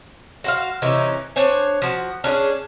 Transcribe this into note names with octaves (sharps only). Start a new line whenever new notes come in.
F#4 C5 F5
C3 E3 C#4 D#4
D4 C5 C#5 G#5
F3 F#4
C#4 D4 F4 G#4